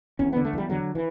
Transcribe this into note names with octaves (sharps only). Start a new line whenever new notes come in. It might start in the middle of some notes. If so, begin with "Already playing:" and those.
E2 C#4
D3 B3
A3
E2 G3
D3 F#3
E3